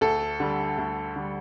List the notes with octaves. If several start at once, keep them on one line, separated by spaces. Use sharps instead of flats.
D2 A4
D3 G3
D2
D3 G3